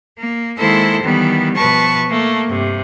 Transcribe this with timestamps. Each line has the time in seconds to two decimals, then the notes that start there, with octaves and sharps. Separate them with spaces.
0.17 A#3
0.57 D#3 G#3 A#3 E4 A4 C5
1.02 D#3 E3 G3 B3
1.55 B2 F3 B4 A5 C#6
2.08 A3 A#3
2.46 G2 C3